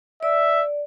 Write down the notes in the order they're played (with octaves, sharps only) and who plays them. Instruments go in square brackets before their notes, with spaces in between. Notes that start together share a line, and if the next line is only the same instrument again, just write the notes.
[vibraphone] D5 [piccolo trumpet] E5